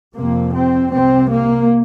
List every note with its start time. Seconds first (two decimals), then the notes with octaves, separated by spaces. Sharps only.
0.15 F2 C3 A#3
0.54 C4
0.92 C2 C3 C4
1.31 A#3